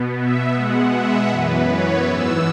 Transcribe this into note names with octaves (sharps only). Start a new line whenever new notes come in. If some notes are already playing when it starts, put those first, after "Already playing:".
Already playing: B2 B3
E5
B2 G#3 B3 F#5
E5
F#2 E3 B3 B4
C#5
G#2 E3 B3 E6